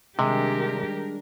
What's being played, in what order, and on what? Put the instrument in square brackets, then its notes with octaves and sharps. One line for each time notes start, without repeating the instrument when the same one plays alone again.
[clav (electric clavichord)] C3 [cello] D#3 G4 [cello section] G3 D4 A#4 [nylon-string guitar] G#3